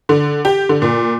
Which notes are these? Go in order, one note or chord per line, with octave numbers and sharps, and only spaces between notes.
D3
G4
D3
A#2